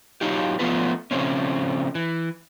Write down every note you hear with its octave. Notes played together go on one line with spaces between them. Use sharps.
F#3 D#4 F4 G4
F3 A3 B3 F4 B4
C#3 F3 A3 A#3 C4 C#4
E3